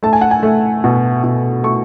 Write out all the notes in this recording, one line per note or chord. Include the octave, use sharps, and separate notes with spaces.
A3 A5
G#5
F#5
G#5
A3
B2
B2
A3 C#6